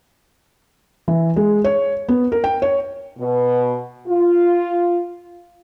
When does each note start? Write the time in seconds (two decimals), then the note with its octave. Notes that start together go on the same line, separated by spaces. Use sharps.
1.08 E3
1.36 G#3
1.64 C#5
2.08 B3
2.32 A#4
2.44 G5
2.62 C#5
3.18 B2
4.07 F4